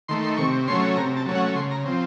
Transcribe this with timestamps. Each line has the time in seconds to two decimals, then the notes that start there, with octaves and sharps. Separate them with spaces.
0.08 D#3 A3 C6
0.24 C6
0.37 C3 C#6
0.68 F#3 A3 C#4 C6
0.97 C3 A#5
1.17 A5
1.26 F#3 A3 C#4
1.35 F#5
1.55 C#3 C6
1.71 A#5
1.85 F3 C4